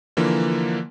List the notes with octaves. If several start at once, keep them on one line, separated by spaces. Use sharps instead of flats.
D3 E3 F3 A#3